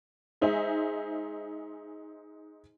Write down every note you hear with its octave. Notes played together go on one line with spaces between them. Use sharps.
G#3 D#4 C5 E5 G#5